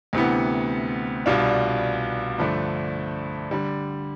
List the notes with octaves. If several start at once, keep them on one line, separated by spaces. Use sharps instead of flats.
D2 C3 E3 B3
C2 B2 G3 D4 F4
G2 D3 F3 A3 D4
D3 G3